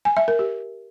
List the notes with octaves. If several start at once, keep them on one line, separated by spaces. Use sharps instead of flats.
G#5
E5
A#4
G4